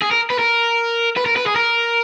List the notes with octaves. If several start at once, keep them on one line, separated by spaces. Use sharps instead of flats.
G#4
A#4
B4
A#4
B4
A#4
B4
G#4
A#4